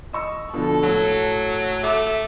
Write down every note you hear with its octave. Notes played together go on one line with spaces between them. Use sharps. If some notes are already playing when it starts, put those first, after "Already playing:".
D#5 C#6 E6
B2 D3 F3 A4
A2 F#3 F#4
A3 E5 D6